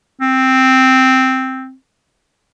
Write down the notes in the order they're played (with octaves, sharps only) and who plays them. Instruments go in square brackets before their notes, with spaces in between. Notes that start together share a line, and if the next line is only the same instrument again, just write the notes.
[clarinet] C4